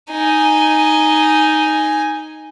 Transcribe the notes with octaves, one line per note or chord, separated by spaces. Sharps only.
D#4 G#5